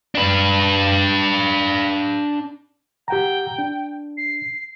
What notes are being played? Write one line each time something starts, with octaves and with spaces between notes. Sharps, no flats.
D4 B4
G4 F#5 G5 A#5
D4
C7